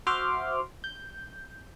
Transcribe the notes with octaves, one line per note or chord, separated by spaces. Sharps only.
F#4 C5 E5 C6 D6 F6
G6